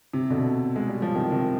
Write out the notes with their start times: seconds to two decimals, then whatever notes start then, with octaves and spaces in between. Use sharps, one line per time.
0.13 C3
0.30 B2 D3
0.76 G#3
0.89 G3
1.02 F3
1.15 C3 D#3
1.32 C3 D#3